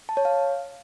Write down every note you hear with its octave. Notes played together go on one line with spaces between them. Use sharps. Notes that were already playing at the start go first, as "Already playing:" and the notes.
A5
C#5
F5